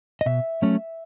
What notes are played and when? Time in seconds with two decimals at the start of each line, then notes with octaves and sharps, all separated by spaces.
0.21 D#5
0.26 B2 E5
0.62 F#3 A3 C#4